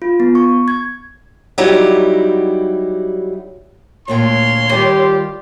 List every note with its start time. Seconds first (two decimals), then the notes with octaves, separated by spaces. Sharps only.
0.02 F4
0.20 B3
0.35 C#6
0.68 G#6
1.58 F#3 G3 D#4 E4 G4
4.08 D2 A#2 C#5 G5 C6
4.72 D#3 G3 F4 G4